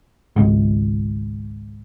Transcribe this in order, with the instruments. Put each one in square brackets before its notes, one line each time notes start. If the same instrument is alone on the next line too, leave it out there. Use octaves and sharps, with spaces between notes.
[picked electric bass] G#1 C#2